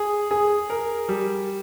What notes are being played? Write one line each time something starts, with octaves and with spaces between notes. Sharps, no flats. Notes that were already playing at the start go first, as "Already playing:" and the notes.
Already playing: G#4
G#4
A#4
G3